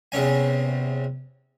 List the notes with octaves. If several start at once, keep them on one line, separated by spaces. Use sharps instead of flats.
E2 C3 C#4 G#5